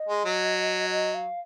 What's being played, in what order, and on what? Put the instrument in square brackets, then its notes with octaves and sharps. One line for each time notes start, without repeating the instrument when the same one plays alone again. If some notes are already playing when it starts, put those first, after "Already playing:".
Already playing: [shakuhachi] D#5
[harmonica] G#3
F#3
[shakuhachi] D#5
F5